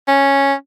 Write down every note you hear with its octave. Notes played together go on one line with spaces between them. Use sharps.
C#4